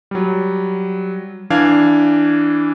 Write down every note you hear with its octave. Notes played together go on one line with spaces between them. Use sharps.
F#3 G3
E3 D4 F5 G#6